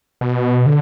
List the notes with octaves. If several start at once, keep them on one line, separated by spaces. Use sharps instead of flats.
B2
D3